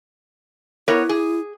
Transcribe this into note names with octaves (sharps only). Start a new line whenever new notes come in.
B3 E4 A#4 C#5
G#4